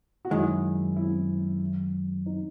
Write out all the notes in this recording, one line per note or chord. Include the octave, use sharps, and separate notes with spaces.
F#4
F#2 D#3 G#3 E4
E4
D#4